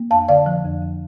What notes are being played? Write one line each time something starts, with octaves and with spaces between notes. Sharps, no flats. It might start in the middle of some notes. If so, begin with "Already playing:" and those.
Already playing: A#3
F2 F5 A5
D3 D5 F5
F3
F2
F2